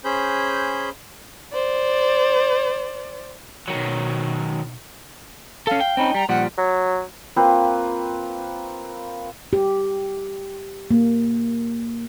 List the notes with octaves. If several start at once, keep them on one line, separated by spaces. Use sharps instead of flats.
C#4 G#4 C5 B5 G6
C5 D5
B2 D#3 F#3
C#4 A4 F5
G5
C4 C#4 D#4 B5
G3 A#5
A#2 F3 G3 F#5
F#3
A#3 C4 F4 B4
G4
A#3